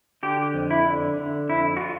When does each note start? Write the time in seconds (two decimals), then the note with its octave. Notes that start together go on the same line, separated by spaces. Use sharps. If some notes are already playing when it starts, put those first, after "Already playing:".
0.23 D3 G4
0.54 F2
0.71 E4
0.86 D3
1.17 D3
1.49 F2 E4
1.77 F#4
1.81 F4